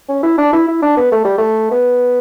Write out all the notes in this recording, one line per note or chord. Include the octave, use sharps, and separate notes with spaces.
C#4
E4
D4
E4
E4
D4
B3
A3
G3
A3
B3